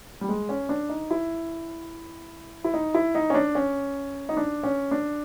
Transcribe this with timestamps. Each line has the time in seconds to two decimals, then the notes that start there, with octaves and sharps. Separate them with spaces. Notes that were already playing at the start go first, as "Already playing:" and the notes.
0.21 G3
0.29 G#3
0.49 C#4
0.69 D4
0.89 D#4
1.11 E4
2.64 E4
2.74 D#4
2.94 E4
3.15 D#4
3.30 C#4
3.34 D4
3.55 C#4
4.29 D#4
4.37 D4
4.64 C#4
4.91 D4